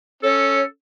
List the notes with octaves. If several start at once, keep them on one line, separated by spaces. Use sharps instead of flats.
C#4 A4 C#5